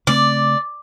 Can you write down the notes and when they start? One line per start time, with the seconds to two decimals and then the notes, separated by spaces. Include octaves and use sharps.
0.07 C#3 A3 C4 D5